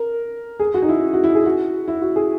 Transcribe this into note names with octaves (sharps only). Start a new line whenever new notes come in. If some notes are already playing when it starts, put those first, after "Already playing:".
Already playing: A#4
G#4
F#4
D#4
E4
F#4
E4
G#4
F#4
E4
F#4
G#4